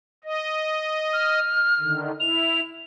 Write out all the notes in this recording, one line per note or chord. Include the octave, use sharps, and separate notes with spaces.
D#5
F6
D3 D#3
E4 F7